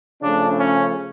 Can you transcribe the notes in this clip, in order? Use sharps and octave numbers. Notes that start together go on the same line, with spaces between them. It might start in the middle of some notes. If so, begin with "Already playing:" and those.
C#3 F3 A3 D4
C#4